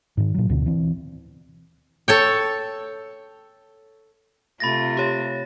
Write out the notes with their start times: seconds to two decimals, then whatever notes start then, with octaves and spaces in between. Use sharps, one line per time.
0.17 G#2 D#3
0.34 A#2 F#3
0.49 D2 B2 D3
0.66 E3 C4
2.08 A4 C#5 G5
4.60 C3 A3 F4 B5 A6 A#6
4.97 G4 C#5